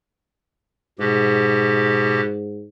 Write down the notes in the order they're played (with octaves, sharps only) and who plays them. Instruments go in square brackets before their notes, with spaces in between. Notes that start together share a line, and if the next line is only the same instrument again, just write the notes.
[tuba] G#2 [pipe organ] B2 G4